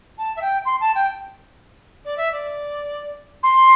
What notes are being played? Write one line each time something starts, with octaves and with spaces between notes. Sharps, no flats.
A5
E5
G5
C6
A5
G5
D5
E5
D5
C6